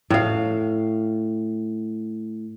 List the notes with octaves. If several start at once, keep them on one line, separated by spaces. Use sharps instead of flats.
A2 F5